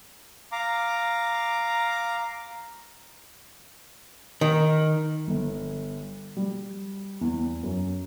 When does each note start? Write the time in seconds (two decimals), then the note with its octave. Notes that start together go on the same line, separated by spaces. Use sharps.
0.52 F5 A#5 D6
4.41 D#3
5.28 G1
6.37 G3
7.21 E2
7.63 F#2